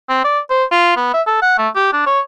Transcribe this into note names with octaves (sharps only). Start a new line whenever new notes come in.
C4
D5
C5
F4
B3
E5
A4
F#5
A3
G4
D4
C#5